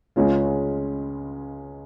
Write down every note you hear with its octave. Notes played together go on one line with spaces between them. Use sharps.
C#2 C#3 G#3 C#4 F4